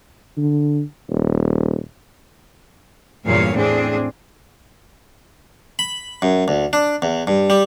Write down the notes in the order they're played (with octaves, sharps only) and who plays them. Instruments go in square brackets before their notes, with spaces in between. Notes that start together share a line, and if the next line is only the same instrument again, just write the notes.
[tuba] D3
D#1
[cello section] E2 G2 A#2 C#5 F5
A2 C4 D4 G#4
[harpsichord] B5
F#2
D2
D4
E2
G2
G3